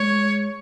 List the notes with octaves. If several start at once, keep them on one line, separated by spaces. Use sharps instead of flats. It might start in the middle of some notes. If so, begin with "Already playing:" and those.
Already playing: G#3 C#5